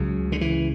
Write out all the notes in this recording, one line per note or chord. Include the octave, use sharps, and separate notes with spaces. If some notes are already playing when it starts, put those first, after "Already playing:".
Already playing: C#2 C#3 F#3
D3
E3